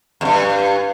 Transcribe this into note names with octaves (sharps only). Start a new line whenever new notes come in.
E2 G2